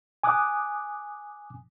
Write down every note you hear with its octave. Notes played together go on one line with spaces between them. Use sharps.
G#5 D6 D#6 F#6